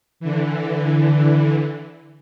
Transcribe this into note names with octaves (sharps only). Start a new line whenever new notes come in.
D3 E3